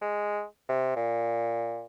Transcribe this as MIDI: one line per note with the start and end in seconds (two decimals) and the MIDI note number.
0.02 0.44 56
0.69 0.91 48
0.96 1.85 46